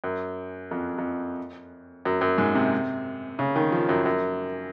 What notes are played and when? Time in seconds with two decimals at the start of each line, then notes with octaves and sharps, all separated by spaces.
0.04 F#2
0.71 F2
0.98 F2
2.05 F#2
2.21 F#2
2.38 G#2
2.55 C3
3.39 C#3
3.56 D#3
3.72 F3
3.89 F#2
4.06 F#2